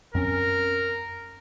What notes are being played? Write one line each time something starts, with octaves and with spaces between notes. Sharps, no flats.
F#2 C4 C#4 A#4